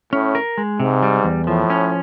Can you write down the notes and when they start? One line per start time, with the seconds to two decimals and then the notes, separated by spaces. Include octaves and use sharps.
0.13 A2 C#4
0.35 A#4
0.58 G#3
0.80 G#2 C3
1.02 G3
1.24 E2
1.47 A2 F3
1.70 C#4